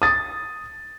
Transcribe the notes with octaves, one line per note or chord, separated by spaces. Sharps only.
D#6 A6